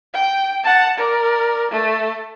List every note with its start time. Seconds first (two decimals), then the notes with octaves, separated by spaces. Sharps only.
0.14 G5
0.64 F#5 A5
0.98 A#4 D5
1.71 A3